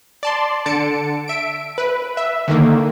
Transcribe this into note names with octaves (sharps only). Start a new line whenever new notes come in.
D5 A5 C6
D3 A5 C#7 D7
E5 D7
B4
E5
D3 D#3 A#3